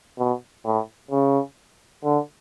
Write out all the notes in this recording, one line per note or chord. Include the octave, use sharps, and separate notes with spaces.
B2
A2
C#3
D3